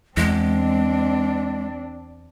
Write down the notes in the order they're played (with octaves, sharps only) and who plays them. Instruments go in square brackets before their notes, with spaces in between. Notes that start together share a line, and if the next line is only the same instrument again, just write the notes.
[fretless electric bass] E2 [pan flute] G#3 [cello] C4 D4